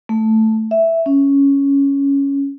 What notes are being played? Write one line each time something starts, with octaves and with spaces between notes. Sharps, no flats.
A3
E5
C#4